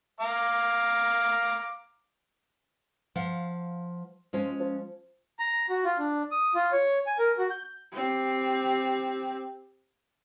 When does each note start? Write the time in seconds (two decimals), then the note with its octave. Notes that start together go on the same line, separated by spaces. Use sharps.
0.20 F5 A#5 D6
3.15 F3 F5 F#5
4.33 F3 G#3 C#4
4.60 F3
5.39 A#5
5.70 F#4
5.85 F4
5.99 D4
6.32 D#6
6.55 F4
6.72 C#5
7.07 G#5
7.19 A#4
7.38 F#4
7.51 G6
7.93 C4 G4